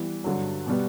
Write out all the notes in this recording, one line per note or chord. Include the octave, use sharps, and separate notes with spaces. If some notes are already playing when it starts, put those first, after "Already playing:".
Already playing: E3 G3 B3
G2 D3 F#3
B2 G3 B3